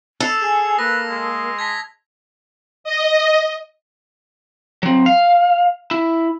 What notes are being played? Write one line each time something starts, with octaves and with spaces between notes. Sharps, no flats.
A4 E6 C7 F7
G#4 G#5
A#3 B4 A#6
G#3
A5 G#6 A#6 B6
D#5
F#3 C4
F5
E4